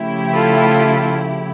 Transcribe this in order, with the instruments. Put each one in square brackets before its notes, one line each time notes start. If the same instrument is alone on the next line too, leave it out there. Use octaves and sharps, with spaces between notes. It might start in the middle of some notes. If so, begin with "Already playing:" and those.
Already playing: [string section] C#3 F3 A3 E4 G4
[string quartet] F4 A4